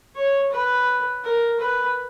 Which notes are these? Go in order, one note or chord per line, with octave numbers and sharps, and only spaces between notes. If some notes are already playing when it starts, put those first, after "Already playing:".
C#5
B4
A#4
B4